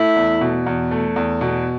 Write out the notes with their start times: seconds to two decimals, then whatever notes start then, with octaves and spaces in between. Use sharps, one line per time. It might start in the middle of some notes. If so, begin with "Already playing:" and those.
Already playing: A3 E4
0.16 E2
0.41 B2
0.66 E2
0.91 A3
1.16 E2
1.41 B2